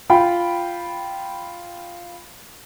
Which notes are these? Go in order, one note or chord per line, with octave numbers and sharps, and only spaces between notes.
F4 G5 B5